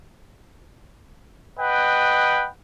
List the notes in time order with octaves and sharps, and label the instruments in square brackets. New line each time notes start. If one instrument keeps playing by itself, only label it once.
[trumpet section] B4 D#5 F#5 G5